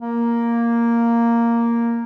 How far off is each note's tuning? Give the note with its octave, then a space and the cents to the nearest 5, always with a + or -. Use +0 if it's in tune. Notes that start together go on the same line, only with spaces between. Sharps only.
A#3 +0